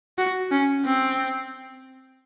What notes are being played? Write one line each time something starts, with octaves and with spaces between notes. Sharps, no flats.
F#4
C#4
C4